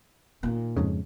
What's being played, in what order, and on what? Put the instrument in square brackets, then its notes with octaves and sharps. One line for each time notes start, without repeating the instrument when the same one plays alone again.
[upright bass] A#2 D#3
[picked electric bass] F2 G#2 C#3